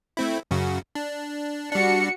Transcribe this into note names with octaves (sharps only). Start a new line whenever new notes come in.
A3 C4 E4
F#2 C#3 F#4
D4
G3 D4 F#4 C#7